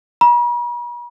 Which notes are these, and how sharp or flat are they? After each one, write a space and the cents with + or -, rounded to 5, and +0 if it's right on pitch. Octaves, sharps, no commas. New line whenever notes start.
B5 -45